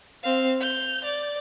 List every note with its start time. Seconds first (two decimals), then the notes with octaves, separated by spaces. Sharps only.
0.23 C4 F5
0.61 G6 F7
1.04 D5